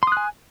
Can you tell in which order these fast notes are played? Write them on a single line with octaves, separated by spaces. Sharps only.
C6 D#6 F#6 G#5